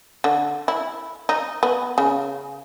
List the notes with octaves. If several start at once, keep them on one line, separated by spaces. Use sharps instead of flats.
D3
E4
D#4
B3
C#3